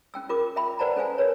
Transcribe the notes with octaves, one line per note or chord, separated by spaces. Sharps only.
C#4 G5 E6
F4 A#4 D6
E5 G5 B5
B4 C5 D5 F#5 A5 A#5
C#4 A4 C5 F5 G#5
A#4 B4 C#5